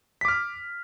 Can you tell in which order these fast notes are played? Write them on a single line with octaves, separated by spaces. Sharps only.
B6 D6 F6